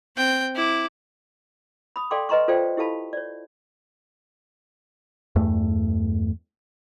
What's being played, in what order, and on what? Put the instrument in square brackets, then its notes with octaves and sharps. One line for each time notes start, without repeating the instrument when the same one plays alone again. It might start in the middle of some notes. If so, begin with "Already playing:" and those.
[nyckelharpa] C4 G5
E4 D6
[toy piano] B5 D#6
A4 D5 F5 G5 C6 D6
B4 D#5 A#5 C6 C#6
F4 A4 C5 D5 F5 G5
E4 G4 A4 F5 A5 B5
C#5 D5
[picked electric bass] E2 G2 A3